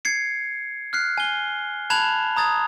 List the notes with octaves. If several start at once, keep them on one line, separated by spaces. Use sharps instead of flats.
G#6 C7 C#7
F6 F#6 C7
G#5 G7
A5 B5 F#6 G#6 E7 F7
A#5 D#6 G#6 A6